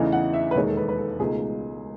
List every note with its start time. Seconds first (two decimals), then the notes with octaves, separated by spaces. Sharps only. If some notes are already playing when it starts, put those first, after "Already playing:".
Already playing: E2 C#3 E3 A3 D#4
0.12 F#5
0.33 E5
0.51 B4
0.55 E1 D#2 D#3 G#3 C#5
0.67 A4
0.77 B4
0.89 B4
0.98 A4
1.19 C#2 B2 A3 D#4 G#4